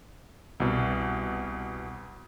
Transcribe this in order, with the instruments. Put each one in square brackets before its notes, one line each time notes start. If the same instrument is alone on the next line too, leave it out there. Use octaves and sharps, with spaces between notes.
[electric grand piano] C2 B2